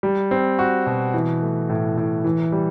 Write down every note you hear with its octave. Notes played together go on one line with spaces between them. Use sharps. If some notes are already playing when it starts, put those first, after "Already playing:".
G3
C4
F#4
B2
E3
A3
A2
A2
E3
G3